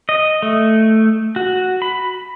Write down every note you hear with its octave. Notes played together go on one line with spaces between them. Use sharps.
D#5
A3
F#4
B5